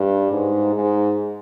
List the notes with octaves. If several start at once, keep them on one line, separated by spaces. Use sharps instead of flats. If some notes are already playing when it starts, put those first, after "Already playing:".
Already playing: G2
G#2
G#2